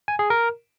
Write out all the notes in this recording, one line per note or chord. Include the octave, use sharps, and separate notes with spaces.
G#5
G#4
A#4